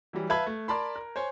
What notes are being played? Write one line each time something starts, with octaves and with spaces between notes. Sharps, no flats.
E3 F#3 G3
B4 E5 F5 A5 B5 G#6
A3
A#4 D5 A5 B5 C6
A#4
C5 C#5 G#5